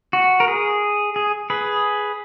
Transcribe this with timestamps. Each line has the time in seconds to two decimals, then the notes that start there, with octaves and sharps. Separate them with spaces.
0.13 F#4
0.40 A#4
0.48 G#4
1.16 G#4
1.50 G#4 B4